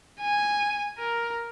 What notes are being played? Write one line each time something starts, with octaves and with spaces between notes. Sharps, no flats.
G#5
A#4